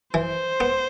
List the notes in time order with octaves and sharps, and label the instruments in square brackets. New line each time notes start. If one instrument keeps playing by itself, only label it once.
[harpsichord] E3 [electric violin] C5
[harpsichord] B3